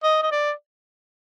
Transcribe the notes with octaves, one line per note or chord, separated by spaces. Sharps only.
D#5
D#5
D5